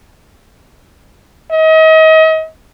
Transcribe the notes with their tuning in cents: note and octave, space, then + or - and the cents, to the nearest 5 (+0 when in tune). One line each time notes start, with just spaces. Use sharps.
D#5 +35